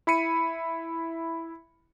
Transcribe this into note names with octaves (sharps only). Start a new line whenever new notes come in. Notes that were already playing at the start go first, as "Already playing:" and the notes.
E4 B5 C#7 D#7